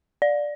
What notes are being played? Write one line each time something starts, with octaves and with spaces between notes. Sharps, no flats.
D5